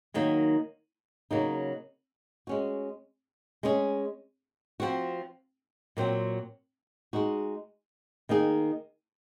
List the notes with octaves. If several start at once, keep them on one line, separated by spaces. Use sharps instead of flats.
D#3 F#3 A#3 D#4
C#3 F#3 A#3 D#4
G#3 C#4 F#4
G#3 C#4 G#4
F3 C4 F#4
A#2 F#3 C4 F#4
G#3 D#4 F#4
D#3 A#3 D#4 G#4